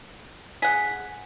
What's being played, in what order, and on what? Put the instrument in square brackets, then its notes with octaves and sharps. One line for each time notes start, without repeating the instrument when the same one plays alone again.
[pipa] G#4 F#5 [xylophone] B6